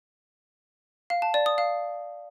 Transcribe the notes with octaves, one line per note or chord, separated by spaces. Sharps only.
F5
A5
D5
D#6
F5